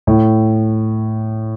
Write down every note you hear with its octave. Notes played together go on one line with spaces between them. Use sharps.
A2